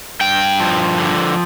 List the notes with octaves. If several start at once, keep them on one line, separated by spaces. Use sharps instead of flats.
G2 G5
F3
D3